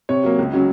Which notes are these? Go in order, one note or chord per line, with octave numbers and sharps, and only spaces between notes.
C3 C#5
F#3 A#3
C#2
C#3 F#3 C#4